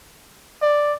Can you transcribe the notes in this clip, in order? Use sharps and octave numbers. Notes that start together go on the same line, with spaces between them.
D5